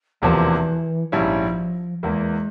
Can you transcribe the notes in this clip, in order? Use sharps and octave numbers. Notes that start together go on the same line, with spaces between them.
E1 E2 C3 E3 F3 A#3
A#1 G#2 F3 G3 C#4 E4
E2 E3 G#3 A#3 E4